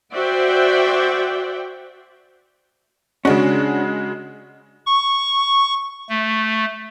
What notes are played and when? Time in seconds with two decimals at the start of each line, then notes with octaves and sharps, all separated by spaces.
0.13 F#4 C5 D5 E5 F#5 G5
3.25 C#3 G#3 C#4 D4 F#4
4.86 C#6
6.09 A3